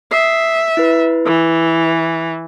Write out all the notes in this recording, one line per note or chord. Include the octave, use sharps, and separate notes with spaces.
E5 D#6 C7
E4 B4
E3